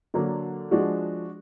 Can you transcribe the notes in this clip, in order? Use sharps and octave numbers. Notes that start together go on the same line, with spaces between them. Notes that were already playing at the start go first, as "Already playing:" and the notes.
D3 F#3 A#3 D4
F3 G#3 D4 F#4